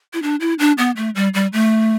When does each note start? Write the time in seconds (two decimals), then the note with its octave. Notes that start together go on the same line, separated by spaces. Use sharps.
0.13 E4
0.23 D4
0.40 E4
0.59 D4
0.78 B3
0.97 A3
1.15 G3
1.34 G3
1.53 A3